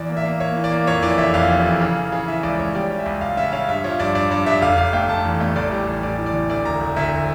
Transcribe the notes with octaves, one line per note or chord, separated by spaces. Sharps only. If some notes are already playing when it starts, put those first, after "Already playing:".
Already playing: E2 D5
A#3
E5
A#3
A#3 C#5
E3
D5
A#3
F2 C#5
E3 D5
F1 E5
F2 F5
F1
E3
C#3
E3
C#3
E3 E5
C#2 D5
C#2 C#5
G3 D5
C#4
E5
C#2
C#2 F5
C#3 E5
C#4 F5
G2 E5
F3 C#5
G2 D5
G2 D5
G2 D5
G2 E5
F1 F5
F1 F5
A3 G5
F1 A5
E2
A3
A1 D5
G3
A1
A2 D5
A2
D5
A1
D2 D5
E1 A#5
E1
D2 E5